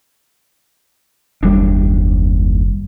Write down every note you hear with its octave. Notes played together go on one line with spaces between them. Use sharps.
F#1 D#2 G3 D4